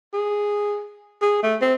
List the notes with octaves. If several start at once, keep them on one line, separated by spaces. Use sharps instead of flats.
G#4
G#4
A3
C4